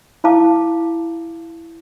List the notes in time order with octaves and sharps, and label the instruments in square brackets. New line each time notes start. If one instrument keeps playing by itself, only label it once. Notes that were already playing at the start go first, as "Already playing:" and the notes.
[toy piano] E4 F5 A5 D6